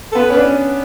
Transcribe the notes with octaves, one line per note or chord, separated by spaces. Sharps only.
A4
B3 B4
C#4 B4
D4